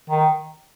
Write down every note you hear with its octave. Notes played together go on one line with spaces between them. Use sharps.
D#3